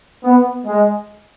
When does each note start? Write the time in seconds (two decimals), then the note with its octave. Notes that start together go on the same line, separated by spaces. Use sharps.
0.24 B3
0.66 G#3